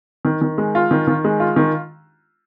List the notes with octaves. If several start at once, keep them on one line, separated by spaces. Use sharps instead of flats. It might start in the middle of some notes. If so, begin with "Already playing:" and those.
D#3
D#3
G#3
F4
D#3
D#3
G#3
F4
D#3